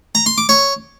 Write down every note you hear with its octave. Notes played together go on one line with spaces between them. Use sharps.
A#5
C6
D6
C#5